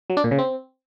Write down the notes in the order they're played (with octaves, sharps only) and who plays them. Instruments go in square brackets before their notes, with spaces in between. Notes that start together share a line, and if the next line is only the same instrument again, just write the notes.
[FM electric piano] F#3
D4
A#2
C#3
C4